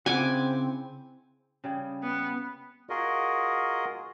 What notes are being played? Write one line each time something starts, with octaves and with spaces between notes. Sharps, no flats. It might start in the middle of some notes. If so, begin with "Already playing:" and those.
C#3 C4 E4 F#5 G#5 D6
C#3 G3 G#4
B3
F4 F#4 G#4 A#4 D#5